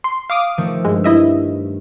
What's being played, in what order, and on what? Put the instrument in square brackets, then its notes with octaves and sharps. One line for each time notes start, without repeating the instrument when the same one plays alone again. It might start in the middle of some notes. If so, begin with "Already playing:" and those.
[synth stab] C6
F5 D6 D#6
[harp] D#3 F3 A3
[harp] G2 [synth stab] G#3
[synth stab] E4 D#5 E5